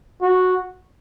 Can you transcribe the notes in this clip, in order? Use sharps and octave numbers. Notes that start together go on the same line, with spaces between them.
F#4